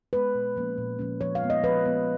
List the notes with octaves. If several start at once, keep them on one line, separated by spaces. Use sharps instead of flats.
G#3 B3 B4
A#2
F3 A#3 C#4
A#2
F3 A#3 C#4
F3 C#5
F5
G#3 B3
D#5
F3 B4
G#3 B3